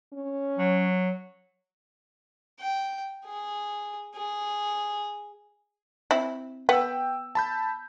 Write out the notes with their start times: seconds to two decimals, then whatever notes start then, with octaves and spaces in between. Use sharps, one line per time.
0.13 C#4
0.58 F#3
2.60 G5
3.25 G#4
4.15 G#4
6.11 C4 E4
6.69 B3 G5 E6
7.35 A5 B5 G6